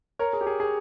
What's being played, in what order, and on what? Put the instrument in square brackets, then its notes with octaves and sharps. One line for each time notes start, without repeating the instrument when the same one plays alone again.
[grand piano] A#4 C#5
G#4
G4
G#4
G#4